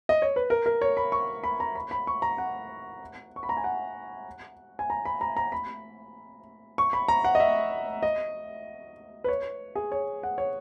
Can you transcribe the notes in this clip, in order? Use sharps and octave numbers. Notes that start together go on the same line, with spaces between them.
D#5
C#5
B4
A#4
A#4
C#5
B5
C#6
B5
A#5
B5
B5
C#6
A#5
F#5
C#6
B5
A#5
G#5
F#5
G#5
A#5
B5
A#5
A#5
B5
C#6
B5
A#5
F#5
D#5
E5
D#5
B4
C#5
G#4
C#5
F#5
C#5